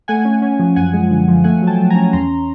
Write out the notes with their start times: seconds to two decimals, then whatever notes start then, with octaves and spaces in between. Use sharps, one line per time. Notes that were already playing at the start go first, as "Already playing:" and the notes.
0.08 A3 F#5 G#5
0.25 C#4
0.42 C#4
0.59 F3
0.76 F#2 F#5 G#5
0.93 G#3
1.11 D3
1.28 F3
1.44 A3 F#5 G#5
1.62 F#3
1.67 G5 A5
1.78 F#3
1.90 G#5 A#5
1.96 C#4
2.13 E2 A#5 C6